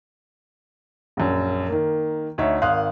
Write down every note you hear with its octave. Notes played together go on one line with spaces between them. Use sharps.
A#1 F#2
D#3 A#3
D2 D#4 C#5 E5
G#1 D#3 F5 C6 D#6 F#6